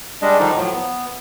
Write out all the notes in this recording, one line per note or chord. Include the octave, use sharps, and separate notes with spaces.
G3 G#3 D4 D#5
D3 D#3 F3 G3 D4 D#4
A2 F3 F#3
B3